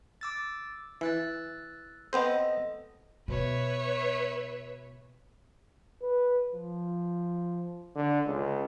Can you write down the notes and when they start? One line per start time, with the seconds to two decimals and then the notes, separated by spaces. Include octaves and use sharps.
0.21 D6 E6 A6
1.01 E3 E6 F#6 A6
2.13 B3 C4 A4 C5 D#5
3.28 B2 B4 C#5 E5
6.03 B4
6.53 F3
7.95 D3
8.27 C#2